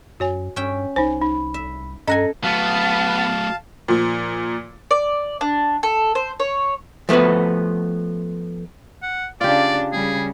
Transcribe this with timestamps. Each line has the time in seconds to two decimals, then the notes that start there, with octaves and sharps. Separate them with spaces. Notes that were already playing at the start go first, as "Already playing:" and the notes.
0.20 F#2 F#4 C#5 G#5
0.56 G2 C#4 E5 G5
0.96 C2 D#4 C5 G#5
1.22 D#4 B5
1.54 E5
2.07 G2 C#4 A4 D#5 F#5 G#5 A#5 A#6
2.43 F#3 A3 B3 F5 A5
3.88 A#2 F3
4.91 D5
5.41 D4
5.83 A4
6.15 C5
6.40 C#5
7.09 F3 A3 B3 F#4 B4
9.03 F#5
9.41 C#3 D4 F4 G4 D5
9.93 C#3 G3 G#4